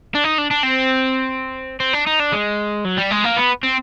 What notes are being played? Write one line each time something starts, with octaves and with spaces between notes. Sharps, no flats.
D4
D#4
D4
D4
C4
C4
D4
D#4
D4
G#3
F#3
G3
G#3
A#3
B3
C4